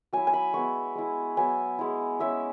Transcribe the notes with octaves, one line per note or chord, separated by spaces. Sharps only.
F#3 E4 G#5
G#5
B5
G#3 B3 E4 C#6
G#3 E4
F#3 B3 E4 G#5
G#3 E4
G#3 C#4 E4 E5